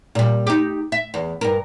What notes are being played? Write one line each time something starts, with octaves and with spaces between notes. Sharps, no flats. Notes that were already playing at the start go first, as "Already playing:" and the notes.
A#2 G3
D#4 G4
E5
E2
G2 A#4